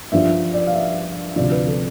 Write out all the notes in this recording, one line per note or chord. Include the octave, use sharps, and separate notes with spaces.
G2 F3 E5
D5
F5
E5
D2 C3 F3 D5
B4
A4